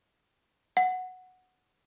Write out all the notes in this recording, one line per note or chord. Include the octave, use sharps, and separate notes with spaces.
F#5